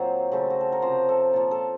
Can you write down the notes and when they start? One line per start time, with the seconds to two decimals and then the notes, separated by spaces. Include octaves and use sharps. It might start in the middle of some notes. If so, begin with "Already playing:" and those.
Already playing: A#2 F#3 C4 C5
0.32 C#3 A3 C4
0.50 F#4
0.61 A4
0.72 A#4
0.82 C3 F3 C4 C5
1.09 A4
1.33 A#2 F3 A#3
1.51 A4